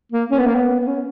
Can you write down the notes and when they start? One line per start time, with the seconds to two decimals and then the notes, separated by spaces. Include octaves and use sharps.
0.12 A#3
0.31 C#4
0.39 B3
0.47 A#3
0.55 B3
0.80 B3
0.87 C#4